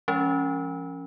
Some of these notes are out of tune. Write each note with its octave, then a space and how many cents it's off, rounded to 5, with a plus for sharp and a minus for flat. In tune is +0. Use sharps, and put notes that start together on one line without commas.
F3 -30 G#3 +0 C#4 +0